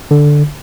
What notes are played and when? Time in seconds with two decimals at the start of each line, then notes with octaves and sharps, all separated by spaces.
0.11 D3